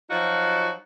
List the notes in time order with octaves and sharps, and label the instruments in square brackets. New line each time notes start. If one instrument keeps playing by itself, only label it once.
[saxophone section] F3 F#3 D#4 F4 F#4